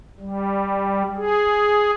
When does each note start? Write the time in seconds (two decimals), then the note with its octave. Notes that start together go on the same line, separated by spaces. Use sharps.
0.20 G3
1.16 G#4